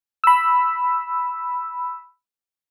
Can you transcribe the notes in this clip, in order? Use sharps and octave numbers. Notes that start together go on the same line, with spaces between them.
B5 E6